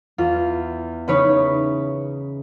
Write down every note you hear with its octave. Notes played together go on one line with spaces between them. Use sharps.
E2 F4
C#3 E3 C#4 D#4 B4 C#5